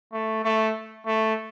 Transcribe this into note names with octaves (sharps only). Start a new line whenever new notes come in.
A3
A3
A3